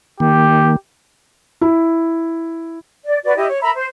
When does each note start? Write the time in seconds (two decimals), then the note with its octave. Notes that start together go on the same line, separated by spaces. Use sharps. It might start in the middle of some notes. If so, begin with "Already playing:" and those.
0.20 D#3 A#3 G4
1.61 E4
3.05 D5
3.24 F#4 B4 D5
3.36 E4 G4 D#5
3.49 C#5
3.61 A#4 E5 A#5 B5
3.75 C5